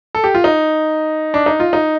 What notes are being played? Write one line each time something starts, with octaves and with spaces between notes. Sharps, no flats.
A4
G4
F4
D#4
D4
D#4
F4
D#4